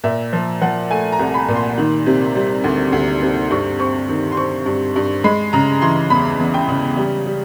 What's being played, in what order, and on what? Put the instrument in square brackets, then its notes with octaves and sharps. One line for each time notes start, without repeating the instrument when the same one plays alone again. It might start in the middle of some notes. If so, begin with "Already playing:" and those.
[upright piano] A#2 E5
F3
F3 F#5
A3 G#5
A#5
C2
B5
A#2
C6
D#3
C3
G3
D2
D2
C3
G2 C#6
C4 C#6
D#3
C6
C4 C#6
G2
G2
G#3 B5
C#3 A#5
E3 C6
E2 B5
E2
G5
C#3
G3
G3